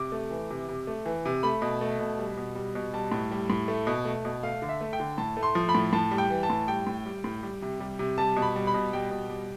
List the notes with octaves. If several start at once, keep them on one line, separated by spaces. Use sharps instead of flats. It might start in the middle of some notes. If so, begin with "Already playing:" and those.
Already playing: C3 D6
A3
E3
C3
C3
A3
E3
C3
A3 B5
B2
A3
B2
G3
B2
G3
B2
G3 A5
A2
G3
A2
A3
B2
A3
B2
A3 F5
D3
E5
A3
G5
D3
A2 A5
A3
C6
F3
B5
A2
A2 A5
G3
G5
E3
A5
A2
G3 G5
A2
G3
A2
G3
C3
G3
C3
G3 A5
B2
B5
G3
B5
B2
G3 G5
B2
G3